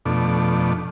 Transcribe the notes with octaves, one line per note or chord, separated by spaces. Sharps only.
F2 B2 A3 D4